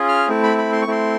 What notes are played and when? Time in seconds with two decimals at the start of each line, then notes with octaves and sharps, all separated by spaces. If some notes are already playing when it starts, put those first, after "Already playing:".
Already playing: C#4 F4 G#4
0.09 F6
0.28 A3 C4 E4
0.43 B5
0.58 B5
0.72 C6
0.82 C#6
0.87 A3 C4 E4 C6